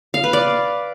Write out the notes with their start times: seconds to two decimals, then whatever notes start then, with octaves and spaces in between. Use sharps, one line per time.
0.14 F5
0.24 B4
0.33 D5